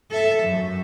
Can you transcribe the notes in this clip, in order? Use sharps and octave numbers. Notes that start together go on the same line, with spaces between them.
A4 E5
F#2